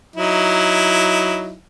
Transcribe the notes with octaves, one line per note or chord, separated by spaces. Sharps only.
F#3 D#4 E4